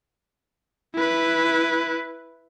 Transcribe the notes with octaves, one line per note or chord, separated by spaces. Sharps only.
E4 B4